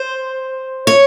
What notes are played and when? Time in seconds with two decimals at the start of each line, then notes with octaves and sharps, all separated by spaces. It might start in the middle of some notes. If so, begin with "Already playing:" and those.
Already playing: C5
0.87 C#5